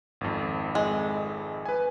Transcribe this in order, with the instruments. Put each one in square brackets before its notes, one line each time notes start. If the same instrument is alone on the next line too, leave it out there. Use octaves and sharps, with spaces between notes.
[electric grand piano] G#1 F2
[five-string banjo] G#3
[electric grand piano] B4 G#5